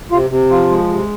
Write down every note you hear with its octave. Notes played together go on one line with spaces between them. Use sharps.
C3 F4
C3
F3 F4
G#3
C3